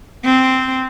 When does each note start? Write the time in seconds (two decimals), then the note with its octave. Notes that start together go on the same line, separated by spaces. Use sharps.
0.24 C4